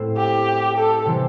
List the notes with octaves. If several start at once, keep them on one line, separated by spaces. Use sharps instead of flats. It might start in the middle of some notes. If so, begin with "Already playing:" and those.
Already playing: A2 A3 C4 E4
G4
A4
C3 E3 G3 C4